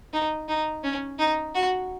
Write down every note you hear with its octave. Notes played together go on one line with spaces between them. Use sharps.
D#4
D#4
C#4
D#4
F#4